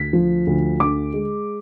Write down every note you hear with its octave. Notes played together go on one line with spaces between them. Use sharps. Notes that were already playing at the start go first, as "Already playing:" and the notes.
Already playing: D2 B6
F3
D2
D3 D6
G#3